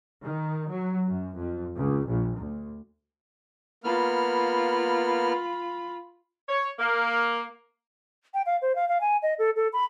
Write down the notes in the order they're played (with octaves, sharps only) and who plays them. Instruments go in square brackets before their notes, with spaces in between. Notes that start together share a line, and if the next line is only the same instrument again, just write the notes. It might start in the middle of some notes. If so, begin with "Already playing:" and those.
[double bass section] D#3
F#3
F#2
F2
C#2
A#1
D2
[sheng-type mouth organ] A#3 B3 F6 [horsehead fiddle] F4 B5
[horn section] C#5
A#3
[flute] G5
F5
C5
F5
F5
G#5
D#5
A4
A4
B5